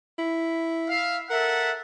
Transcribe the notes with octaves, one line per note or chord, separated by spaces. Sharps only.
E4
E5 F5
A4 A#4 E5 F#5